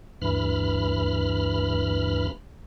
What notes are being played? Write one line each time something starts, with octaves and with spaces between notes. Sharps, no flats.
D2 G2 E3 B5 F6